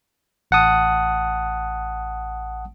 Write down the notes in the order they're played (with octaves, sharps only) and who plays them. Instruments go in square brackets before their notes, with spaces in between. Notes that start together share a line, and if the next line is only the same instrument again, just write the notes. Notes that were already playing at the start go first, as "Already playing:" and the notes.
[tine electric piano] A1 F#5 A5 D#6